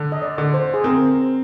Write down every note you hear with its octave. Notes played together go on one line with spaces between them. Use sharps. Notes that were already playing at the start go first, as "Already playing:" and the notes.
Already playing: D3
D#5
D5
D3
C5
G#4
C4 A#4